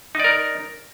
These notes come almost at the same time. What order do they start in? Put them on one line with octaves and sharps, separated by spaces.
D#4 D5 A#4